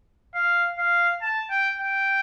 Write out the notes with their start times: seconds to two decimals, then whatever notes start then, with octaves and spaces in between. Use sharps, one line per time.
0.35 F5
0.78 F5
1.22 A5
1.50 G5
1.80 G5